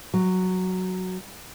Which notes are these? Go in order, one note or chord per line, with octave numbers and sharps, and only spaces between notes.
F#3